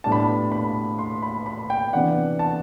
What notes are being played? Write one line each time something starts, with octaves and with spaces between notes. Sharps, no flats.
A2 G3 B3 D4 A5
B5
A5
B5
C6
B5
B5
G5
C3 E3 B3 D4 F#5
A5